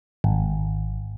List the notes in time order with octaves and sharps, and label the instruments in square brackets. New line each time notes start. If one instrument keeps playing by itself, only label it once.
[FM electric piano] G#1